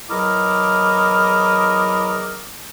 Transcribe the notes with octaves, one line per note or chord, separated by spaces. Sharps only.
E2 F#3 E4 A#4 D#5 D6